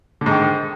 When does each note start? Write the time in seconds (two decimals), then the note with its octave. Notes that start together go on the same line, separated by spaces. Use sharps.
0.21 D3
0.26 G#2
0.31 D#3